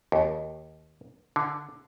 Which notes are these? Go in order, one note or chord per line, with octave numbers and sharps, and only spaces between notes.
D#2
D3